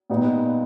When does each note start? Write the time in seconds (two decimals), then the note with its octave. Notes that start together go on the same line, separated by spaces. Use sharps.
0.10 A#2 G3 B3 D#4